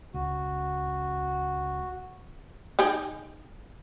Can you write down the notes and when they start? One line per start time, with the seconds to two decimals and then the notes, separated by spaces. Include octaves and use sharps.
0.14 C#2 F#4
2.79 D#4 G4 G#4